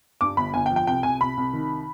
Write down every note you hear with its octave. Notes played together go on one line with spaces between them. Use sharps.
G2 D6
G1 B5
G1 G#5
G5
F3
G5
C2 G5
C2 G#5
C2 B5
C2
D#3